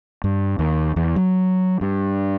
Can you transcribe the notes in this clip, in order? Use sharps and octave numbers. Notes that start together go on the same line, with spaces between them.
G2
D#2
E2
F#3
G2